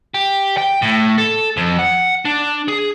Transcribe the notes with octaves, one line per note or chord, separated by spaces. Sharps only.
G4
G5
A2
A4
F2
F#5
D4
G#4